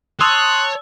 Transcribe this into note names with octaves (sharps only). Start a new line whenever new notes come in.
C#5 A5 C6 D#6 E6 F#6